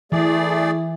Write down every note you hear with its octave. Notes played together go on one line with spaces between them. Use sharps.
E3 A3 G#4 D5